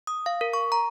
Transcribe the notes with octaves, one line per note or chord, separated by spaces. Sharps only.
D#6
F5
A#4
C#6
A#5